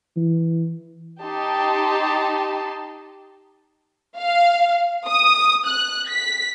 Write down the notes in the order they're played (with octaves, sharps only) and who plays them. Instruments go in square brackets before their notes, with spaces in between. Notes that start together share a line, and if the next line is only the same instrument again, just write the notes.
[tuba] E3
[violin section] D#4 G4 A5 C6
F5
D#6
F#6
B6